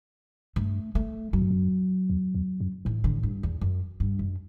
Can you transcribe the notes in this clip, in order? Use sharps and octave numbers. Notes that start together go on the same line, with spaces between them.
G2 A3
A3
F#2 F#3
G2
F#2
E2
E2
F#2
A2 E3
D3
G2
E2
F#2
G2
F#2